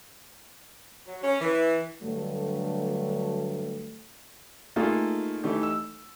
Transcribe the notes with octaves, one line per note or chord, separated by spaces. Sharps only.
F#3
C#4
E3
G2 D3 F#3 A3
A3 A#3 D#4 F4 G#4
E3 A3 D#4 G4
E6